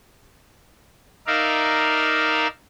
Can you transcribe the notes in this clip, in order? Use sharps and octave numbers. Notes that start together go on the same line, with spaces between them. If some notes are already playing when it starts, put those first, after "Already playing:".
D#4 A#4 D5 E5 F5